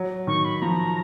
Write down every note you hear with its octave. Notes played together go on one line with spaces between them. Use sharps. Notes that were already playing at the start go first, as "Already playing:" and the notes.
Already playing: F#3
D#3 C#6
B5
F3 A#5